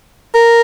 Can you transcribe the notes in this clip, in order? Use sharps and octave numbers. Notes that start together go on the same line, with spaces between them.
A#4